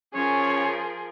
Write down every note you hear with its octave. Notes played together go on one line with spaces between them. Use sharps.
F3 C#4 G#4 A#4 C#5